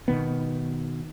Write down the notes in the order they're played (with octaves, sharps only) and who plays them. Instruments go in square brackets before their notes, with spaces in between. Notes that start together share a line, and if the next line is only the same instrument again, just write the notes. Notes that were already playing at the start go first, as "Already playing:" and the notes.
[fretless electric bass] B2 D#3 B3